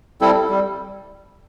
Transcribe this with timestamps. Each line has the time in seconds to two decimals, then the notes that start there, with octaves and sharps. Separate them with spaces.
0.21 G3 C4 E4 A4
0.50 G3